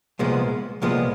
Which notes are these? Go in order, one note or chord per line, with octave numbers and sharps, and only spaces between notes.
C2 A#2 F3 G#3 B3
C2 A#2 F3 G#3 B3